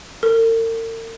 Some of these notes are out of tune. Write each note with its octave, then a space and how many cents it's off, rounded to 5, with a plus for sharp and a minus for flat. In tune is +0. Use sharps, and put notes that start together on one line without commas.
A#4 -45